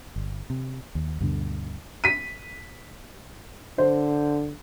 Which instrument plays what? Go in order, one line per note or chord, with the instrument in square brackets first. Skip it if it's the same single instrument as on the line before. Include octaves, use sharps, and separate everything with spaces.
[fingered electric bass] G1
C3
D#2
D2 G2 B2 D3
[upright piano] B6 D#7
[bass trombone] D3 [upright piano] C5